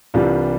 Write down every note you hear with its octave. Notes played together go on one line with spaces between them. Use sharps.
C2 C3 E3 G3 D4 F4